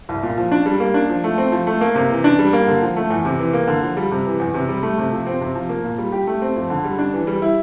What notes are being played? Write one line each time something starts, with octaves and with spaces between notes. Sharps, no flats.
C2
A#2
F3
D4
G3
A#3
D4
F3
A3
C4
F3
A3
A#3
C3
E3
D4
G3
A#3
D3
F3
A3
E2
C3
E3
A#3
D3
F3
G3
C3
E3
E2
C3
G3
A3
C3
F3
C4
C3
F3
A#3
A#2
G3
G4
A3
C4
F2
D3
G3
D4
E3
G3
E4